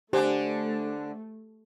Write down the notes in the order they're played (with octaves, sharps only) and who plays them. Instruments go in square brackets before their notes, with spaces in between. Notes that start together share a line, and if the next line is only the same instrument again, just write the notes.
[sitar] D3 D4 [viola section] A3 [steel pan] G4 [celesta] C5 G#5